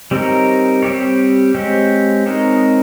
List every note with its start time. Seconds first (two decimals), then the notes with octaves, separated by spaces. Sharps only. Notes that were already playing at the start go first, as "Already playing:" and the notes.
0.11 G3 C4 D#4 A#4 C#5
0.83 G3 C4 G4 C#5
1.54 G#3 C4 G4 C#5
2.26 G#3 C4 D#4 A#4 C#5